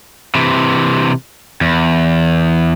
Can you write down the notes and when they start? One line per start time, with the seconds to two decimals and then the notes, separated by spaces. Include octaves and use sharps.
0.35 C3 E3
1.61 E2